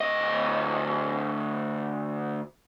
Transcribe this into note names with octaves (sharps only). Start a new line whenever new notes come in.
D2 D#5